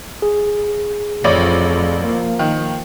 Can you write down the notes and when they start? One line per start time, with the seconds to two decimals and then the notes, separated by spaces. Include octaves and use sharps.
0.22 G#4
1.24 A1 F2 F3 C#5 D5
2.03 F3 A#3
2.39 D#3